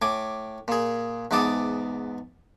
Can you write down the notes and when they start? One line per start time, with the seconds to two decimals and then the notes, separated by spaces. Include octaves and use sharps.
0.02 A2 G#5 D6
0.68 A#2 G#4
1.31 E2 G#2 B3 A5 D6 D#6